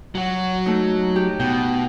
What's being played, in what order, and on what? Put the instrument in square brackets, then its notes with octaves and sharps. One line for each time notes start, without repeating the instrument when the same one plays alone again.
[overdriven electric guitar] F#3 F#4
[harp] A3 D#4
G4
[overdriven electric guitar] B2 [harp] G5